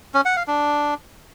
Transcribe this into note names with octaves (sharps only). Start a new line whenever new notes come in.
C#4
F#5
F5
D4